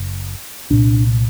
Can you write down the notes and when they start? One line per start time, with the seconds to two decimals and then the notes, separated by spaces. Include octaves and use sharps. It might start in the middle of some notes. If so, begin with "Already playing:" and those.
Already playing: F#1 F#2
0.70 C2 A#2 D4